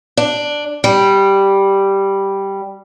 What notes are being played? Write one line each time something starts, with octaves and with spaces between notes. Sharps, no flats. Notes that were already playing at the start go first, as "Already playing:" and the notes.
D4
G3